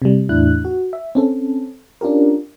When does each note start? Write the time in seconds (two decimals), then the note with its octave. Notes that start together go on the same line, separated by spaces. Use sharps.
0.02 C3 G3
0.29 E2 A2 D4 E4 F#6
0.65 F#4
0.93 E5
1.15 C4 C#4 A4
2.01 C#4 D4 F4 G4 A#4